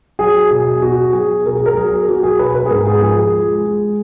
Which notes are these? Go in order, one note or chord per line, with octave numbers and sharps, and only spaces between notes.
F#3 G#4
B2 G#4
B2 F#4
F#3 G#4
B2 A#4
G#4
A#4
F#3 G#4
F#3 F#4
G#4
B2 B4
B4
G#4
G#2 A#4
G#4
F3 G#4
G#4
G#3
G#3